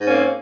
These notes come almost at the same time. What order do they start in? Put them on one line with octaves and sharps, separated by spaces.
G#2 C#4 A#3 C4